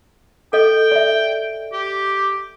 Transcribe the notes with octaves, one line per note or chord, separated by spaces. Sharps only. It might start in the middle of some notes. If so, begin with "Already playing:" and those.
A4 D#5 G5
D5 E5
G4